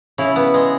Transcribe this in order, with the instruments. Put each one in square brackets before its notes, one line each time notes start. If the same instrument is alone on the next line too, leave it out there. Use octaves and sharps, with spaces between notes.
[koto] C#3 E4
B3
G#3